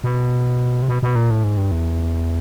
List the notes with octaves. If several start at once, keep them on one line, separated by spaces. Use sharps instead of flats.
B2
C3
B2
B2
A#2
A2
G#2
G2
E2